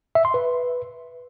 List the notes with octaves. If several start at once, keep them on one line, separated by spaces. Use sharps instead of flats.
E5
C6
B4